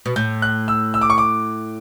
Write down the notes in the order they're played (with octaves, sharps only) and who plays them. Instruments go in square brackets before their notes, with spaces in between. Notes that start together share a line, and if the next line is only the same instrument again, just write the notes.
[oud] B2
[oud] A2 [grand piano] G6
[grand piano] F#6
E6
E6
D6
C#6
D6